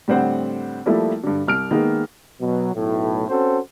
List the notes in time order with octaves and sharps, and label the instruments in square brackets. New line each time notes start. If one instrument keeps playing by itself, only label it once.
[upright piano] A2 D3 G3 C4 C5 F#5
F3 G3 A3 A#3 E4
G2 D3
C2 F6 D7
D#3 G#3 A#3 B3 D#4
[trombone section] B2 F#3
B1 A2
C4 C#4 F#4 A4 C5